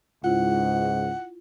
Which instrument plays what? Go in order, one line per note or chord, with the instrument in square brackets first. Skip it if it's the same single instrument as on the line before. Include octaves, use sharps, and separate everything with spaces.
[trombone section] C#2 G#2 [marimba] E4 F4 [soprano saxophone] F#5